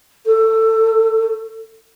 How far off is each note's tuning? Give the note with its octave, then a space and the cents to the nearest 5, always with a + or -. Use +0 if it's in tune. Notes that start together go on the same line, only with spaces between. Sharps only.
A4 +20